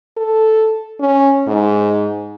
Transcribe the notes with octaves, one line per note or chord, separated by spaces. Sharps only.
A4
C#4
G#2